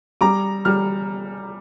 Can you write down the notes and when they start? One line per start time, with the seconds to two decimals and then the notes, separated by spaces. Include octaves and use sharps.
0.21 G3 A#5 D6
0.65 G3 F6